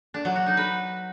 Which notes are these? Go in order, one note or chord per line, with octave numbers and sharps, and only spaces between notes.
D4
F#3
F#4
D#4
B4